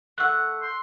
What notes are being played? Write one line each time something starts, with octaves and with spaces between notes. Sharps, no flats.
A3 F#5 E6 F#6
C6